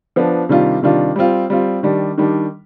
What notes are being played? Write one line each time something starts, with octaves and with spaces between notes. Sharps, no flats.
F3 B3 D4
C3 D#3 G3 D4 F4
C3 D#3 G3 D4 F4
G3 C4 F4
G3 C4 F4
D#3 G3 D4
D#3 G3 D4